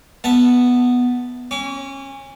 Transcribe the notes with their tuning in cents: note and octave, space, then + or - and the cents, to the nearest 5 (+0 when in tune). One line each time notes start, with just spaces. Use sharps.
B3 +0 E5 -5 A5 +0
C#4 -25 C#6 +45